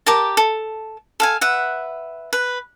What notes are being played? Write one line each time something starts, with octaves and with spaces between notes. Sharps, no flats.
G4 A#4 A5
A4
A4 F5 G#5
B4 E5 F#5
B4